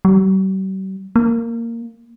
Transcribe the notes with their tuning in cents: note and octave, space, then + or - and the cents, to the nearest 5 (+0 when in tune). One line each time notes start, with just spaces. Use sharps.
G3 -45
A#3 -10